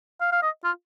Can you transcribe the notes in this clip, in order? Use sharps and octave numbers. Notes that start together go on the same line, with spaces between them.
F5
F5
D#5
F4